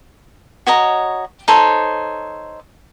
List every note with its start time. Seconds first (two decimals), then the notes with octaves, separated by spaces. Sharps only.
0.67 F#4 C#5 D#5 A#5
1.48 D#4 A4 C5 C#5